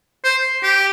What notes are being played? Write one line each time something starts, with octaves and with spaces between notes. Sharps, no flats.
C5
G4